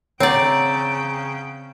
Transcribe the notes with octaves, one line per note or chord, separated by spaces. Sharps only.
C#3 C4 C#5 D5 F#5 G5 A#5 D7